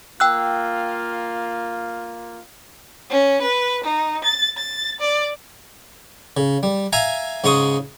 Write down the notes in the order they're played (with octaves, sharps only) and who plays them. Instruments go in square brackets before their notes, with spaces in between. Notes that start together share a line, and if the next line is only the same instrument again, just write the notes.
[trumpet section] A#3 F4 [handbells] G5 E6 F#6
[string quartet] C#4
B4
D#4
A6
A6
D5
[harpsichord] C#3
G3
E5 F5 G#5 A#5
G#2 C#3 D#4 C6 C#6 D#6